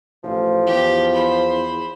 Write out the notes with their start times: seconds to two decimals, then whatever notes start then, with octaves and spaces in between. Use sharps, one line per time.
0.24 A1 F3
0.67 E2 G4
1.14 C5 B5